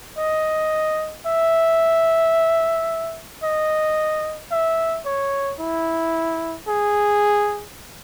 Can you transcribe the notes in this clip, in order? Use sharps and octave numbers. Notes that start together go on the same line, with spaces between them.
D#5
E5
D#5
E5
C#5
E4
G#4